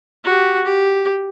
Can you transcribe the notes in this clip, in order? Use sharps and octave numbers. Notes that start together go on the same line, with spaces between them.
F#4 G4
G4